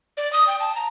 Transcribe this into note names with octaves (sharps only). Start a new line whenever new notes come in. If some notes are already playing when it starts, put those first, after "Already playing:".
D5
D#6
G5
A5
A#5